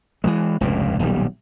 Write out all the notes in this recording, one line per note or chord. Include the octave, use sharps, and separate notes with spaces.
E3 F#3 G#3
F1 C#2 G2 A#2
D#1 B1 B2 G3